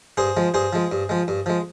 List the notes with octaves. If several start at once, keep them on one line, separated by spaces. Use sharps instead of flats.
G2 G#4 C5
F3 G#3
G2 G#4 C5
F3 G#3
G2
F3 G#3
G2
F3 G#3